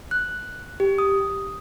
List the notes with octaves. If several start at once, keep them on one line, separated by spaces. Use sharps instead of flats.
F#6
G4
D#6